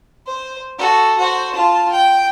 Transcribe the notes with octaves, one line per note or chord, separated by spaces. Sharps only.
C5
F#4 A4
F#4 C5
F4 A5
G5